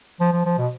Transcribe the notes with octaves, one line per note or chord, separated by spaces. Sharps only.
F3
F3
F3
B2